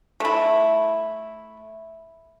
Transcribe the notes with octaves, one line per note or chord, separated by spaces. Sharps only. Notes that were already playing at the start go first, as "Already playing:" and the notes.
A3 E4